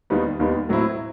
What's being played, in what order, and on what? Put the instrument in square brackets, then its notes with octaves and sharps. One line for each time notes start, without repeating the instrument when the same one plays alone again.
[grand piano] D#2 D#3 G3 B3
D#2 D#3 G3 B3
A2 F#3 C4 E4